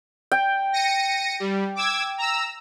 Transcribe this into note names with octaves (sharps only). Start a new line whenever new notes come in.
G5
A#6 C#7 D#7
G3
D6 E6 G#6
A#5 E6